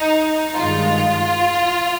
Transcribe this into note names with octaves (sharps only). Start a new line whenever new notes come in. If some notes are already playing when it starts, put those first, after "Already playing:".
Already playing: D#4
G2 D#3 G#3 F4